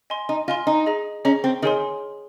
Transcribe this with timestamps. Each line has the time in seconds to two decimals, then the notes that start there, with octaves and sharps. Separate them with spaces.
0.10 D#5 G#5 C6
0.29 D#4
0.48 F4 D#5 G#5 C6
0.67 D#4
0.86 G#4 D#5 A#5
1.25 C#4 G#4 D#5 A#5
1.44 C4
1.62 D#3 G#4 C#5 G#5 C6